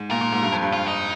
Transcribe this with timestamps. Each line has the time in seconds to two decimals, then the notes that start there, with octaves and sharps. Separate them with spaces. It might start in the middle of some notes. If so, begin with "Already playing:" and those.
Already playing: G#2
0.11 A#2 A#4
0.21 A#2
0.32 G#2
0.42 G2
0.52 F2
0.63 G2
0.73 F4
0.88 D#4